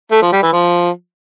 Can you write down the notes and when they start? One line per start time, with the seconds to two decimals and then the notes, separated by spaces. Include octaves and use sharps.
0.12 A3
0.22 F3
0.33 G3
0.43 E3
0.53 F3